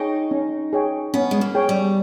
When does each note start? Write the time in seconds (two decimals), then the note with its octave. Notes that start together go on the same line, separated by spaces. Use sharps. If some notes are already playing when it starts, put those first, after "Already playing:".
Already playing: D#4 G#4 C#5 G5
0.31 C#4
0.73 G#4 C#5 G5
1.14 B3 C#4
1.31 G#3
1.41 A#3
1.55 G#4 C#5 G5
1.69 G3